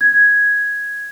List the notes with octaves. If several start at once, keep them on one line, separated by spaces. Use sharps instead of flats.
G#6